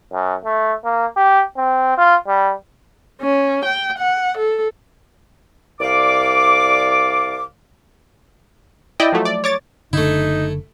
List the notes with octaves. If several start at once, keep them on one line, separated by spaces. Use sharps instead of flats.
F#2
A3
A#3
G4
C4
F4
G3
C#4
G5
F#5
A4
C2 D5 F5 D6
E4 D5 D#5 G5
F3 F#3 A3
D5
C#5 D6 A6
F#1 D3 A3 D#4 E4